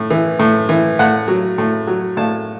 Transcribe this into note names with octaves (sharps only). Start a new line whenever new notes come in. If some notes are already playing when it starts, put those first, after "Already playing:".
Already playing: A2
E3
A2
E3
A2 F#5
F#3
A2
F#3
A2 A5